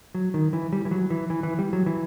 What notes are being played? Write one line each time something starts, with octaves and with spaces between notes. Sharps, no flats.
F#3
D#3
E3
G3
E3
F#3
E3
E3
E3
G3
F#3
E3